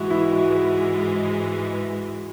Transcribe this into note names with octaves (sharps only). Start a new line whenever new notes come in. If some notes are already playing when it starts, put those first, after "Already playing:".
Already playing: G#2 E3 G#3 E4 F#4
E4
F#4